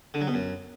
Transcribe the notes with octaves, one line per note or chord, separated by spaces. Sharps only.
D3
F#3
B2
F#2